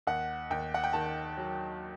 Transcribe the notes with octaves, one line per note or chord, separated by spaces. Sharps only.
D#2 F#5
D#2 G5
F#5
G5
D#3 A5
F#3